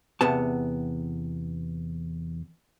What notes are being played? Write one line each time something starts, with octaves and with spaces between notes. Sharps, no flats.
E2 C3 B3 A5